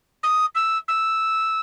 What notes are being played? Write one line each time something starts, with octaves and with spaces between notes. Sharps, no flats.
D#6
E6
E6